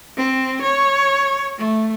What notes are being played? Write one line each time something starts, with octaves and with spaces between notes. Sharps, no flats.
C4
C#5
A3